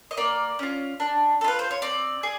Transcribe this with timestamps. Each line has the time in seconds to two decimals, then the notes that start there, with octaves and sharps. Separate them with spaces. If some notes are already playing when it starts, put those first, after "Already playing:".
0.11 D#5
0.17 A#3 D5
0.59 C#4 F4
1.00 D4
1.41 A4
1.44 F4 B4
1.59 C5
1.71 C#5
1.82 C4 D5
2.23 G#4